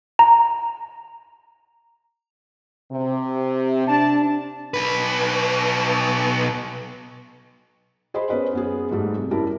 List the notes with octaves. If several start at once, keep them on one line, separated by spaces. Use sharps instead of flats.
A#5
C3
D4 A5
B1 B4
G#4 C5 D#5 B5 C6
B3 C#4 B4 C5
F#2 B3 G#4
G#2 G3 A3
C3
F#2 G3 E4 A#4 A5